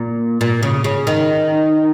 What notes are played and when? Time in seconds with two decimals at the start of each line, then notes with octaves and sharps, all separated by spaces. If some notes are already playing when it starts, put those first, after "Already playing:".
Already playing: A#2
0.41 A#2
0.63 C#3
0.84 C#3
1.07 D#3